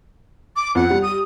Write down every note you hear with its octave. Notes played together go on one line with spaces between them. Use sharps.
D6
F2 F#5
G3
D#6